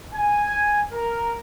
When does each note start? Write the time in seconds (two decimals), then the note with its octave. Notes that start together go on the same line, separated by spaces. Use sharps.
0.12 G#5
0.91 A#4